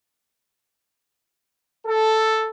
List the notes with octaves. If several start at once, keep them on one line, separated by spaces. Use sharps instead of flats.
A4